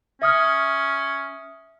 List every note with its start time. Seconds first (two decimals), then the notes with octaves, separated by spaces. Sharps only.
0.22 C#4 E5 D#6 F6